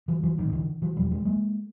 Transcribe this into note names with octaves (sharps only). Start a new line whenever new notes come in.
E3 F#3
E3 F#3
A#1 A2 D#3
D3 E3
E3 F#3
F#1 E2 B2 F3 G3
F#3 G#3
G#3 A#3